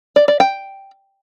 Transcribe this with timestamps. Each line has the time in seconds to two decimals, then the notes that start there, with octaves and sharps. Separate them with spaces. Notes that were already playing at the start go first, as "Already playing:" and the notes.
0.16 D5
0.28 D5
0.40 G5